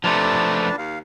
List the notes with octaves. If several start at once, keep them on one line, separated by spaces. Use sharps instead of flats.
C3 F3 A3 D4 B4 A5
C#2
D#2 F5